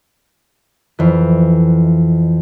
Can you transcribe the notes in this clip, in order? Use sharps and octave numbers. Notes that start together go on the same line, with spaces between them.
F2 E3